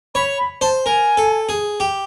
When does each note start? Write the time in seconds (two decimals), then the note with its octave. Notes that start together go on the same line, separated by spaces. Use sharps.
0.15 C#5 B5
0.38 B5
0.61 C5 A5
0.85 A#4 G#5
1.17 A4
1.49 G#4
1.80 G4